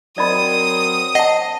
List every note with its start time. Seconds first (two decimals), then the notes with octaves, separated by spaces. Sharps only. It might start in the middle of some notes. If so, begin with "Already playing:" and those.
0.18 F#3 C4 A#4 D5 D#5 B5 D#6
1.15 D#5 F#5 A5